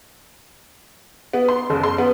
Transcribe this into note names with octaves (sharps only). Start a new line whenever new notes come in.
B3
C6
F#1
C6
B3